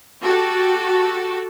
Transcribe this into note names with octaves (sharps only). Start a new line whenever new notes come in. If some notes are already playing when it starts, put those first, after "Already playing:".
F#4 G4 A4